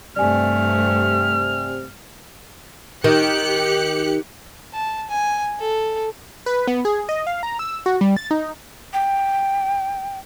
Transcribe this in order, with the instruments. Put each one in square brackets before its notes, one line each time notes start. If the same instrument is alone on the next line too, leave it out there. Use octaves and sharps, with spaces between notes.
[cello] G2 A3 [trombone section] C3 [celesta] D5 G#5 [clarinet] F6
[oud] D#3 [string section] G4 F#6 C#7
[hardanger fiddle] A5
G#5
A4
[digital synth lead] B4
B3
G#4
D#5
F5
A#5
E6
F#4
G3
A6
D#4
[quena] G5